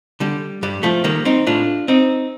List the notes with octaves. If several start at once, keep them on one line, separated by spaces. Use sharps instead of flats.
D3 G3
G2 G3
F3 A3
D#3 G3 A#3
C4 D#4
A2 D4 F4
C4 D#4